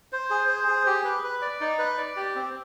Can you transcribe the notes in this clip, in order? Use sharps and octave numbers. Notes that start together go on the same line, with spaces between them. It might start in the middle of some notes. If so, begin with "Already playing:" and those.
C5
G#4
C5
G#4
G4
B4
B4
D5
D#4
B4
D5
G4
C4